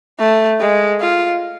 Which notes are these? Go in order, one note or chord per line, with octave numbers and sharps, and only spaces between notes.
A3
G#3
F4